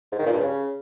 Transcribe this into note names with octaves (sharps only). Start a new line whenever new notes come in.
G#2
D#3
A#2
G2
C#3